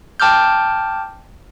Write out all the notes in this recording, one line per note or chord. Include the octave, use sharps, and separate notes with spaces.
G5 A5 D6 F6 G6